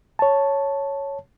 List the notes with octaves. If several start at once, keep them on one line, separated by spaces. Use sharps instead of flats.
C#5 A5